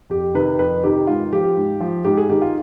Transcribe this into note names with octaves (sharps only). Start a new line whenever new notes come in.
F2 G4
C3 D#3 B4
F2 B4
C3 D#3 G4
G#2 F4
F3 G4
G#2
F3
G#2 G4
G#4
D#3 G4
F4